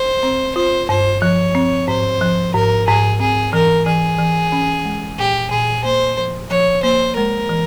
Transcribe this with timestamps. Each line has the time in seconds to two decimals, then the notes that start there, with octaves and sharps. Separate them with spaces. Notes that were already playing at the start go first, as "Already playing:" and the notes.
Already playing: C5
0.23 C4
0.56 F4 C5
0.89 G2 C5
1.22 F3 C#5
1.55 C4
1.88 G#2 C5
2.21 F3
2.54 G#2 A#4
2.87 G#2 G#4
3.20 C4 G#4
3.53 E3 A#4
3.86 E3 G#4
4.19 E3
4.52 C#4
4.85 G#3
5.19 A#2 G4
5.51 A#2 G#4
5.84 A#3 C5
6.17 F3
6.50 F3 C#5
6.83 A#3 C5
7.16 G#3 A#4
7.49 E3